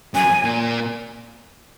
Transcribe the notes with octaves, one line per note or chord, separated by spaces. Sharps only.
F#2 G#5
A#2